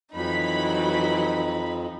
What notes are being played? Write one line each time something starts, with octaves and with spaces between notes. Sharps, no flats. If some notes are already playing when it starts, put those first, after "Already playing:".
F2 E3 F#3 D#4 B5